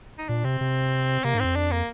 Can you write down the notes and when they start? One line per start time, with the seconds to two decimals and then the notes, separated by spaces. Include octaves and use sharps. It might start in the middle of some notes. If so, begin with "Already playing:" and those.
0.18 D#4
0.29 A#2 D4
0.44 C3 C4
0.61 C3
1.24 C3 A#3
1.34 G#2
1.39 C4
1.44 F2
1.56 D4
1.71 A#3